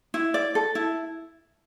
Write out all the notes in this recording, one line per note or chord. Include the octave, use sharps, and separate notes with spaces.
E4
D5
A4
E4